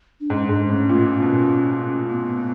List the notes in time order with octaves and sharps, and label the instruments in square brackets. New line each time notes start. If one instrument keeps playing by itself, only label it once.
[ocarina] D4
[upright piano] G#2 [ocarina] C#4
[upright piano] G#2 [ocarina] D4
[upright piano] A2 [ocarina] C#4
[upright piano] A#2
B2
[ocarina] B3